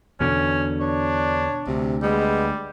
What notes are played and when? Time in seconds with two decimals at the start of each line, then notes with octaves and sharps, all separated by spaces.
0.20 E2 B2 D3 C#4
0.80 D4 C#5
1.67 D2 C3
2.03 G3 G#3 B3